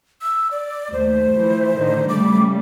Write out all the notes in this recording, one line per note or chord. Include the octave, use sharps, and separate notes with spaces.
E6
D5
D#2 A3 C5
E3 F3
A2 D3 D#3
C#3 G3 A3 D6